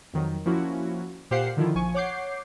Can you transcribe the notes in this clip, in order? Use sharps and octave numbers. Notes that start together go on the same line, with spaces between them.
F2 D#3 F#3
F3 A#3 C#4 E4 F#4
A#2 G4 C5 F5 F#5 C7
D3 D#3 F3 E4 F4
A#1 F3 G#5 C#6
C#5 F#5 D6 G6 C7